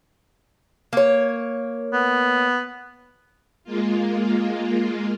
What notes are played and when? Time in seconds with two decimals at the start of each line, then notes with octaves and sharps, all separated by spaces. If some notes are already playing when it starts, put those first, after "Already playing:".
0.93 A#3 C#5
1.93 B3
3.64 G#3 A#3 F4